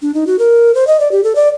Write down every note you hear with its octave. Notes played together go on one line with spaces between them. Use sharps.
D4
D#4
F#4
A#4
C5
D#5
D5
G4
A4
D5